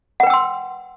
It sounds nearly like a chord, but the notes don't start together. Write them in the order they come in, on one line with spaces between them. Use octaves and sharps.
F#5 B4 G5 E6 C6